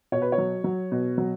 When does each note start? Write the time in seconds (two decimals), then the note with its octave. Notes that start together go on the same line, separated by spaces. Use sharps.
0.12 B2 C#5
0.22 B4
0.32 C#5
0.38 F#3
0.64 F#3
0.92 B2
1.18 F#3